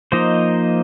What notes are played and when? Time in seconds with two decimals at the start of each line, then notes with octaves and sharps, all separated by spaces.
0.12 F3 A#3 D#4 C5 D#5